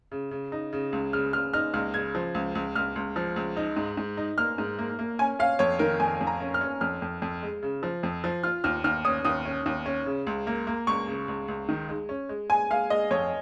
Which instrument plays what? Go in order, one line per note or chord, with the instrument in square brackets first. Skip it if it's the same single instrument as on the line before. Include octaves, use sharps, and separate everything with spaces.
[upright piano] C#3
C#3
D#4
C#3
C#2
[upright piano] C#3 [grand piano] F6
[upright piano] C#3 [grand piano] F6
[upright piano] D#4 [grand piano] F6
[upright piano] C#2 [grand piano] F6
[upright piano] C#3 [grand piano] G#6
[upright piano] F3
C#2
C#2
[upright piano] C#2 [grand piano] F6
[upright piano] C#2
F3
C#2
D#4
G#2
G#2
D#4
[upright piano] A#3 [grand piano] F6
[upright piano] G#2
A#3
A#3
[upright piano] C#4 [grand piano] G#5
[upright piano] C#4 [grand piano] F5
[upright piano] F2 [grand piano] C#5
[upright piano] D#3 [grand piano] A#4
[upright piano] F2 [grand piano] G#5
[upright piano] F2
[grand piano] A#5
[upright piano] C#4
[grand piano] F6
[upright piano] C#4
[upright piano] F2 [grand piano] F6
[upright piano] F2
F2
G#3
C#3
F3
F2
F3
[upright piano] F4 [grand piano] F6
[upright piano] D#2 [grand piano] F6
[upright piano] D#2 [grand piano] F6
[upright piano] C#4 [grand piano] D#6
[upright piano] D#2 [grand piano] D#6
[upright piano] C#4
D#2
C#4
C#3
C#2
A#3
A#3
[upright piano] C#2 [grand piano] C#6
[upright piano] C#3
C#2
C#2
D#3
G#3
C#4
G#3
[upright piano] G#3 [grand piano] G#5
[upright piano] G#3 [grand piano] F5
[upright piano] G#3 [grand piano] D#5
[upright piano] F2 [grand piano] C#5